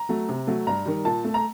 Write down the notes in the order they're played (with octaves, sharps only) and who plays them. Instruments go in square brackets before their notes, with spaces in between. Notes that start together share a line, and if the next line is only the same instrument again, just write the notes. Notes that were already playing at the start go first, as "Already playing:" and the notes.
Already playing: [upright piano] A#5
F#3 A3
C3
F#3 A3
G2 A#5
D#3 G3
A#2 A5
A3
A#5